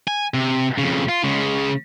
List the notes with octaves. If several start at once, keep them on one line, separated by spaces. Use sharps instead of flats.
G#5
C3
F2 C#3
F4
C#3 G#3